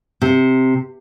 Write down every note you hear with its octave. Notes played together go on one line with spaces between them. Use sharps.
C3